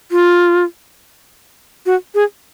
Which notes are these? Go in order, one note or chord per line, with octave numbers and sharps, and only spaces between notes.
F4
F#4
G#4